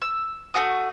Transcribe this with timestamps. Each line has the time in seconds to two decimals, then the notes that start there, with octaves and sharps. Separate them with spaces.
0.02 E6
0.54 A3 D#4 F#4 D#6